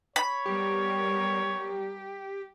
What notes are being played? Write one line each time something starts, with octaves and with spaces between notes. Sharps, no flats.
C#5 B5
G3 B3 G4 A#4